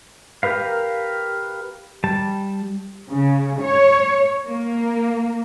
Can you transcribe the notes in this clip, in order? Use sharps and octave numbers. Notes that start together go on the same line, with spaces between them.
G4 A#4 B4 F5
G3 A5
C#3
C#5
A#3